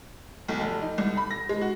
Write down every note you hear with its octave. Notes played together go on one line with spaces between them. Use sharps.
B1
F1
D#4
C2
B5
A#6
G#3
F#4